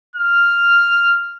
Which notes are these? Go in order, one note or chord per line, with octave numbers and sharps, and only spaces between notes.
F6